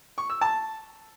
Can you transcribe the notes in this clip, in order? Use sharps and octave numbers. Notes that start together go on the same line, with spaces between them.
C#6
E6
A5